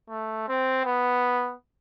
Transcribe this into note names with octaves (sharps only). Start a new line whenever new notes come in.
A3
C4
B3